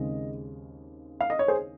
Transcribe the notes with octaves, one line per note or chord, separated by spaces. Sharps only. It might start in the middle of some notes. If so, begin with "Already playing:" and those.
Already playing: D#2 C#3 G#3 C4 D#5
F5
D#5
C#5
G#4 C5